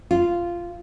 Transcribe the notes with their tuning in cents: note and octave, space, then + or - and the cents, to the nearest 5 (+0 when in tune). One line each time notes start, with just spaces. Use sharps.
F4 -10